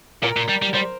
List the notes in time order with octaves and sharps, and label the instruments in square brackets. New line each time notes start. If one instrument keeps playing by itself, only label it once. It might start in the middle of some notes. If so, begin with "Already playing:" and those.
[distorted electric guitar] A#2 [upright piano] A#4
[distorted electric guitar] A#2
G3
G3
[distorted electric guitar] G3 [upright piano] C5